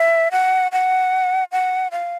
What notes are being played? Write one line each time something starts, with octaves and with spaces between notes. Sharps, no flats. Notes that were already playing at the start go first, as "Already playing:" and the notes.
Already playing: E5
F#5
F#5
F#5
F5